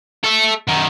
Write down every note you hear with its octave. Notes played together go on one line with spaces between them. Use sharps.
A4 E5
F#2 D#3